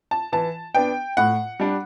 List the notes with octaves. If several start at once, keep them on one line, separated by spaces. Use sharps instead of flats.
A5
E3 A5
B3 D4 G5
A2 F#5
G3 D4